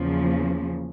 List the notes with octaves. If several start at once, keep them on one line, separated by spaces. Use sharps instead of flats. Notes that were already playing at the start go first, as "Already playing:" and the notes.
Already playing: E2 C#3 F3 A#3